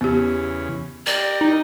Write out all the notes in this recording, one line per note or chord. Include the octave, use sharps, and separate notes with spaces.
E2 C#3 B3 G4
G4 A#4 D5
D#4